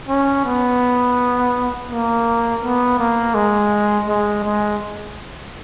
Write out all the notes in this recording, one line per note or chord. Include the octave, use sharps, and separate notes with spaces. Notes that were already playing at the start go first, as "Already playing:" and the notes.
C#4
B3
A#3
B3
A#3
G#3
G#3
G#3